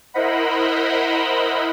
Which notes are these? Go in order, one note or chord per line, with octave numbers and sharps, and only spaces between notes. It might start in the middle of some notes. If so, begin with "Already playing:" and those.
E4 A#4 C5 D#5 F#5 B5